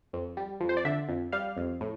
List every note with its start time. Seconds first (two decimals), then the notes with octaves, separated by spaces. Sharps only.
0.13 F2
0.37 G3
0.60 F2
0.69 C5
0.77 D5
0.85 D3 E5
1.08 F2
1.32 G3 F5
1.57 F2
1.81 A2